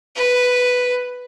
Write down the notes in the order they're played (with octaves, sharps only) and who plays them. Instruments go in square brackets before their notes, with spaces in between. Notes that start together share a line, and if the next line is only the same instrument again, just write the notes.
[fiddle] B4